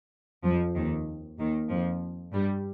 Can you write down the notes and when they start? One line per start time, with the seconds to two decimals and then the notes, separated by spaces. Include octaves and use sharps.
0.44 F2 F3
0.76 D#2 D#3
1.39 D#2 D#3
1.71 F2 F3
2.34 G2 G3